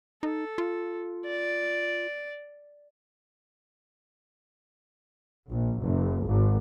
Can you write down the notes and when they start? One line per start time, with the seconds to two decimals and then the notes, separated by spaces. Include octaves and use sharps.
0.23 D#4 A4
0.58 F4
1.25 D5
5.50 A#1
5.81 F#1
6.24 G#1